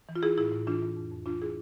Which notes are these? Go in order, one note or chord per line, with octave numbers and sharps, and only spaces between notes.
E3
F4
E3 E4 G#4
A2 E4 G#4
A2
E3 D4 F4
E3
F2
F2
E3 D4 F4
E3 E4 G#4